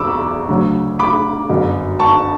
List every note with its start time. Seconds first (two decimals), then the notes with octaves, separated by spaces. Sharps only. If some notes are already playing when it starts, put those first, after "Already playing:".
Already playing: E2 B2 B5 C#6 D6 E6
0.49 D2 C#3 F#3 C#4
0.99 B5 D6
1.49 G1 F#2 D3
1.99 A5 C#6